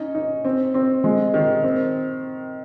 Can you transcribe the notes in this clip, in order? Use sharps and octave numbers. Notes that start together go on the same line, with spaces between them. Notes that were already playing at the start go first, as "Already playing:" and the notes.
Already playing: C#4 D#4
D#4
C4
C4
G#3
D#3
C4